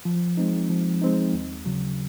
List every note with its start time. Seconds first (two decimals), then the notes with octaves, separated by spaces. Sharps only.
0.05 F3
0.37 G#3 C4 D#4
0.70 F3
1.02 G#3 C4 D#4
1.34 D#2
1.66 C#3 F#3